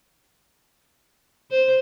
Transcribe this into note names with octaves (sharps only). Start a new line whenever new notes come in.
C5